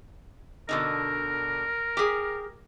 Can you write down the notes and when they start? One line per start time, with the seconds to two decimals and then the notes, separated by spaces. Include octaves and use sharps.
0.69 B2 D3 D#4 A#4
1.97 G4 G#4